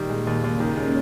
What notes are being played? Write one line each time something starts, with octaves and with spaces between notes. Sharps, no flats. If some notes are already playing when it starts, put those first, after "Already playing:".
Already playing: A#2 D#3 G3 A#3
G#3
D#2
D#2 C#3 C#4
D#3
G#3